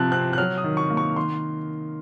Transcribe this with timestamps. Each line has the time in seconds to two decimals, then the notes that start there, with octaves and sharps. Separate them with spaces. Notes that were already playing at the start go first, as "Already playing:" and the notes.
Already playing: C3 F3 F#6
0.12 C4 F#6
0.33 F#6
0.38 F#3 F6
0.58 D#6
0.64 D#3
0.77 C#6
0.90 A#3
0.97 C#6
1.16 D#3 C6